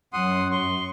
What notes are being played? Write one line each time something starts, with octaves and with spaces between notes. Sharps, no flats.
F#2 F#5 C6 D#6
C6 C#6